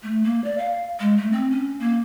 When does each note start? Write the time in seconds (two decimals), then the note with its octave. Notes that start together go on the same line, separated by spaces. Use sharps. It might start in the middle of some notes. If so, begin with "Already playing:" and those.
0.03 A3
0.24 A#3
0.44 D5
0.58 F5
1.00 G#3
1.17 A3
1.32 C4
1.51 C#4
1.80 A#3